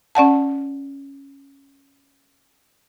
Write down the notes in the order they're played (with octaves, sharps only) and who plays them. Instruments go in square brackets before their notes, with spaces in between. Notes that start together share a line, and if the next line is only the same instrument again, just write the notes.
[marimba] C#4 D5 F#5 A5